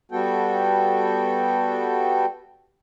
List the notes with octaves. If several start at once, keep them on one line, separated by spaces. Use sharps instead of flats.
G3 B3 F#4 A4 G5